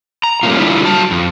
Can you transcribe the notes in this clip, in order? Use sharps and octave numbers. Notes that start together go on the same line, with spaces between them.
A#5
G3 A3 A#3 C4 C#4 F4
D3 G3 E4 F4
F#3 A5
F2